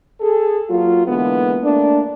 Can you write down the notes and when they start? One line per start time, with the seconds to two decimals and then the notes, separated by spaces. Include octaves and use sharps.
0.21 G#4 A4
0.69 F#3 A#3 F4
1.06 D3 E3 G#3 A#3 B3
1.63 A3 A#3 D4